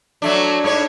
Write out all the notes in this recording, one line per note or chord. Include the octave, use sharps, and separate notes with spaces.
F#3 A3 D4
G#2 D4 C#5